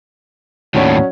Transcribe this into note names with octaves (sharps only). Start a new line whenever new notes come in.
D#2 A2 F#3 C#4 D5